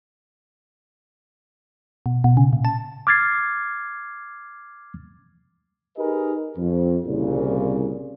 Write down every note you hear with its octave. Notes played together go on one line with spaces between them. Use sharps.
B2
B2
C#3
A#2
A5
D6 F6 G#6 A6 C7
D#4 G4 G#4 A#4 B4 D#5
F2
C2 A#2 C#3